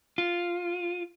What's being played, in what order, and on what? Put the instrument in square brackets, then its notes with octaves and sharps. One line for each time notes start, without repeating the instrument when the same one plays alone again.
[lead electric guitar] F4